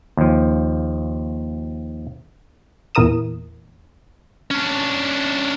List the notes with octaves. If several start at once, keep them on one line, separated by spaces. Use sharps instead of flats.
D#2 F3
E2 A#2 E4 A#4 D#6 E7
C#4 D4